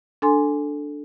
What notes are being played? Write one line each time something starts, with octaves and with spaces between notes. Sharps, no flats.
D4 A4 G#5 C6